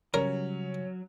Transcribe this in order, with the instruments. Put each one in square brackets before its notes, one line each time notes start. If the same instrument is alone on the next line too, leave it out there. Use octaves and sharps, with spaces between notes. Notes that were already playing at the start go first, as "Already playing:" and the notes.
[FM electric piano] C#3 G3 [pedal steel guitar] F#3 [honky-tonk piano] C#4 [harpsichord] A#4